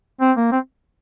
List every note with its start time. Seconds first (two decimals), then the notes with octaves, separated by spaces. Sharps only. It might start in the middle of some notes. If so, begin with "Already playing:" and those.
0.21 C4
0.37 A#3
0.52 C4